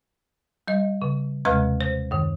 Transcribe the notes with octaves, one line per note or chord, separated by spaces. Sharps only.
G3 D#5
C#3
D#2 C3 G#3 B4 A#5 F6
C5
F#2 D#3